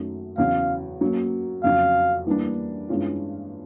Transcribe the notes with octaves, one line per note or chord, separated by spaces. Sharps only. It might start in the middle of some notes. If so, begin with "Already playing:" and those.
Already playing: F#2 D#3 F#3 A3
E2 C#3 F#3 F5
F#3 A#3 C#4
F2 C#3 F#3 F5
E3 G3 A#3 D4
G2 E3 G#3 C#4 F4